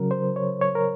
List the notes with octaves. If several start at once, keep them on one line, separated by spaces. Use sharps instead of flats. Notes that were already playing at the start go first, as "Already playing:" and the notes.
Already playing: C#3 F#3 A#4
C5
C#5
C#5
A#4